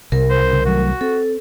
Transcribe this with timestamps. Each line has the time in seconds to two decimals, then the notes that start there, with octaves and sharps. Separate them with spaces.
0.12 C2 C3 A#4
0.30 C5
0.53 C#3
0.66 D#3 F#3 A3 F#4
1.01 C4 A4